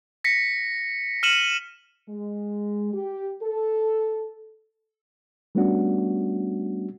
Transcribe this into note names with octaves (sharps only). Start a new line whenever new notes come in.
A#6 B6 C#7
F6 C#7 D#7 E7 F#7
G#3
G4
A4
G3 A3 B3 C#4 D4 F#4